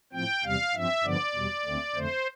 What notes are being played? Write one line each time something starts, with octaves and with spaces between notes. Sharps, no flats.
A2 F3 C4 G5
E2 C3 G3 F5
G2 F3 C4 E5
G2 D3 F3 B3 D5
E2 B2 G3
D2 D3 A3 C4
F2 D3 A3 C5